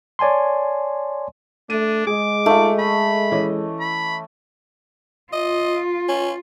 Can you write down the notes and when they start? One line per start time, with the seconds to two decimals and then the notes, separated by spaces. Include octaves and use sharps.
0.19 C#5 D5 G#5 A5 C6
1.70 A3 D4 D#7
2.07 G#3 G#4 D6
2.46 A3 D#4 F4
2.79 D#5 B5
3.32 E3 C#4 D#5
3.80 B5
5.33 F4 D#5
6.09 C#4